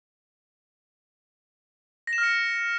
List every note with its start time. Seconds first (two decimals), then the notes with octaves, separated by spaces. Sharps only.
2.07 A#6
2.13 E7
2.18 F6
2.23 C#7